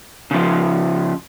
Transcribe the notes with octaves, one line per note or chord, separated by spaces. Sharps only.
C#3 F3